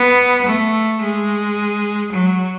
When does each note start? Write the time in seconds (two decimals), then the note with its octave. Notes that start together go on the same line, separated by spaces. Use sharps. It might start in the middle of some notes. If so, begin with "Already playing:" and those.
Already playing: B3
0.47 A3
1.02 G#3
2.13 F#3